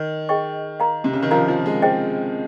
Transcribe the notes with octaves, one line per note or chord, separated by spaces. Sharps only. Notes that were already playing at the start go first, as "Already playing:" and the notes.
Already playing: D#3
G#4 D#5 G5 C#6
A#4 F5 A#5
C3
C#3
D#3
F3 A#4 F5 A#5
F3
G#3
G#4 C5 D#5 G5